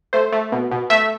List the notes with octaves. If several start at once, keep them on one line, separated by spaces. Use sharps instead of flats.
A3 C5
A3
B2
B2
A3 E5